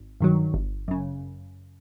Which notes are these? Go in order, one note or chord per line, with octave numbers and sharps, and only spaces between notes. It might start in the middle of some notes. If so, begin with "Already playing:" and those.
Already playing: G#1
G2 D#3 F#3
G1
F#2 C#3